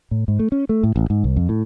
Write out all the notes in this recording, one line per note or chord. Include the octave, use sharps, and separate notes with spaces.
A2
G#2
A3
C#4
A3
A2
A1
G#2
C2
F2
A2